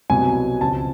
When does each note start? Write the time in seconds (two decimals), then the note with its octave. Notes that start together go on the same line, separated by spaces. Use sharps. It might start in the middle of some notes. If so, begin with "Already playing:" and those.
0.10 C2 B2 F#3 G#5
0.61 C#2 C3 F3 A5